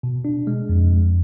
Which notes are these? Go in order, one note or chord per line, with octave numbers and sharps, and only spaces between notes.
B2
D4
G#3
F2
F2